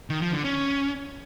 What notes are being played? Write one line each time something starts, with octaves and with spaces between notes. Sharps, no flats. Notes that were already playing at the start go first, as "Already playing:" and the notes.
D#3
F3
D3
C#4